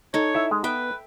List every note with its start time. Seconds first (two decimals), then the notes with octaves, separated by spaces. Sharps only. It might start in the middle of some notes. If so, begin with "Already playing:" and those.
0.14 D#4 A4 C#5
0.34 E4 E5
0.51 G#3
0.64 B3 B4 E5 G5